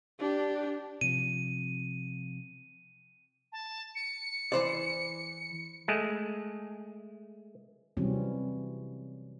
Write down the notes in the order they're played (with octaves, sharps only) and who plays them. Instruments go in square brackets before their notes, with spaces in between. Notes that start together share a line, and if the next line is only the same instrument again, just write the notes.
[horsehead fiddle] D4 G4
[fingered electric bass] C3 F3 [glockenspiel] D#7
[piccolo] A5
C#7
[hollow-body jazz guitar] E3 C5 D5
[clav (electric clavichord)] G#3 A3
[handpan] C3 E3 F#3 G3 C4 C#4